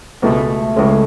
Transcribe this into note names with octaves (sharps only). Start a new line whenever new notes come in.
C#2 B2 G#3 A3
C#2 C#3 G#3 C#4